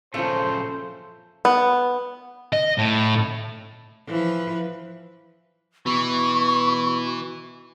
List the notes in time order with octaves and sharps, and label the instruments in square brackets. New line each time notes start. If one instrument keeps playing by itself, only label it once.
[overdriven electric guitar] A#2 C#3 [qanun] F3 C#4 [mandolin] A3 [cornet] C5
[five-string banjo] B3
[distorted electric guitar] D#5
A2
[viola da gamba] E3 F3 B4
[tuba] B2 [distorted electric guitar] E3 [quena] C#6